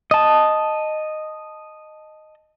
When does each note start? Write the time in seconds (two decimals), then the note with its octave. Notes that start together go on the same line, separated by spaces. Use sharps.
0.11 D#5 A5